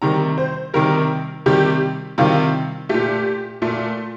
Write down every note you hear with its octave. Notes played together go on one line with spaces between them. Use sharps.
C3 D#3 G3 A#5
C5
C3 D#3 G3 A#4
C3 D#3 G3 G4
C3 D#3 G3 F4
A#2 A3 G4
A#2 A3